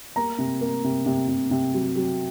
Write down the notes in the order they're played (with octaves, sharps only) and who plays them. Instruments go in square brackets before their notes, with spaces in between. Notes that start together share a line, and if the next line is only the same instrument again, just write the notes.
[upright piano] A#3 A#5
C3
A#3
C3
C3
C3
C3
F#3
F#3